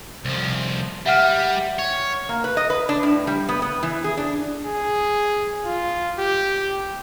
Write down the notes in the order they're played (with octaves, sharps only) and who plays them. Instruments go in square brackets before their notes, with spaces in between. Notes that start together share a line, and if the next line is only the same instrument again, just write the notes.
[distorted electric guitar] C2 F3
[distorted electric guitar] G3 [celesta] E5 F#5 F6
[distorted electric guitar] C#5
[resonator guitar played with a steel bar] A#3
B4
D#5
B4
D4
A2
G3
B3
B3
E3
G#4
D4
[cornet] G#4
F4
G4